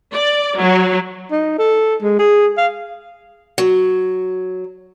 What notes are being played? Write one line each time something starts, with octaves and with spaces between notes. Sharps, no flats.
D5
F#3
D#4
A4
G#3
G#4
F5
F#3